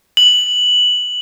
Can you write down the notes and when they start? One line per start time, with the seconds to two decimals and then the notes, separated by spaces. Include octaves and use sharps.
0.17 F#7